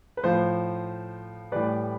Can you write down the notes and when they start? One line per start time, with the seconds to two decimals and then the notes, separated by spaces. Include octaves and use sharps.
0.17 B4
0.23 A2 F3 C5
1.52 A2 E3 G3 B4 D5